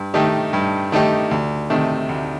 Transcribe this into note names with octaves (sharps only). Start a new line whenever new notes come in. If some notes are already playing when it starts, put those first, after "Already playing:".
Already playing: G2
D#3 A3 D#4 G4
G2
D#3 A3 D#4 G4
D2
C3 D#3 A3
D2